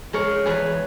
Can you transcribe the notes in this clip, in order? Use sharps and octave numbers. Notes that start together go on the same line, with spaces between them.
G#3 A#4 C#5
E2 G#4 B4